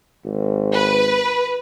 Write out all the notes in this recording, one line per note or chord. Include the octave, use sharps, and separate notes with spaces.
G#1
B4